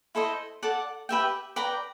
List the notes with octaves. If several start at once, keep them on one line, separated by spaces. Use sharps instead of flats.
E4 A4 C5 D#5
A4 D5 F#5 A5
G4 B4 E5 G5
B4 D5 G5 A#5